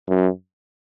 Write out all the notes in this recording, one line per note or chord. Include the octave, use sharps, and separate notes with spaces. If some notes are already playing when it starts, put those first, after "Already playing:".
F#2